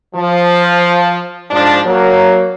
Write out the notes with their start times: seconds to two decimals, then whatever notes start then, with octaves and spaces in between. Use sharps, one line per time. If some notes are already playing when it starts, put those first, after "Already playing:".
0.14 F3
1.50 G#2 F3 D4
1.85 F#3 A#3